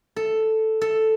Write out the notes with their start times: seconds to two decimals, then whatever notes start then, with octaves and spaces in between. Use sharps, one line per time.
0.16 A4
0.81 A4